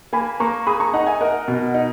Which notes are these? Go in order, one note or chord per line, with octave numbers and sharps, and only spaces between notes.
A#3 G#5 B5
A#3 A#5 C#6
G#4 B5 D#6
A#5 C#6
D#4 F#5 A#5
E5 G#5
A#4 D#5 F#5
B2
D#4